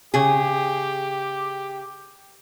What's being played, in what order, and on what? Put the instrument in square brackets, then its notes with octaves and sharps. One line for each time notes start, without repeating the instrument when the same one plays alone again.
[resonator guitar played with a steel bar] C#3 G#4 [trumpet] G4